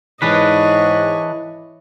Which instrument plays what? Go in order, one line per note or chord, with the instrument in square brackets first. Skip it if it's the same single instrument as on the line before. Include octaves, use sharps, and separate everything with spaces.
[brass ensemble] G#2 [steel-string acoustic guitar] E3 [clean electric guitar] D4 B4 [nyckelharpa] C#5 D#5